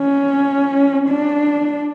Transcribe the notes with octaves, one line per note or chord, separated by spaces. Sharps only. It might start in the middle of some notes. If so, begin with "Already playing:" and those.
Already playing: C#4
D4